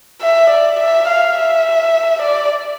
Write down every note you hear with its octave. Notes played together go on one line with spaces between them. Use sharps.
E5
D5
E5
F5
E5
D5